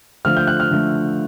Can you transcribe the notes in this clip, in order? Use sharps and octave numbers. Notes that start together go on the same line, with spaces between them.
D3 F3 A3 F6
G6
F#6
F6
D3 F3 A3